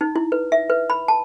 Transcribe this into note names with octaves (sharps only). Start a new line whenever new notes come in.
D#4
E4
B4
E5
B4
B5
A5